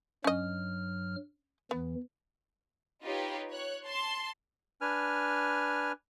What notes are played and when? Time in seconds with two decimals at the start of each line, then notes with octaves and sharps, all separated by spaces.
0.24 G2 F#3 C#4 D#5 F6
1.71 E2 E3 B3
3.04 D#4 F4 G4 B4 C#5
3.51 C#5 F#6
3.86 A5 C6
4.81 D4 B4 G#5 F6